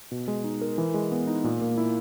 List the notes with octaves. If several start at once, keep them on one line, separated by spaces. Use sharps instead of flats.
B2
G#3
D#4
A#4
E3
G#3
B3
D#4
A#2
A#3
E4